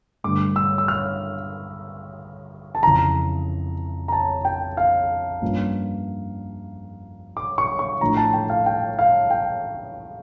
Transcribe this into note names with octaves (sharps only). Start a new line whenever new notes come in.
G2 D3 A3 D6
E6
E6
F6
A5
F2 C#3 E3 A#5
A#5
A5
G5
F5
G2 F3 A#3 C#4
D6
C#6
C#6
A2 F3 A3 D4 A#5
A5
G5
F5
G5
F5
G5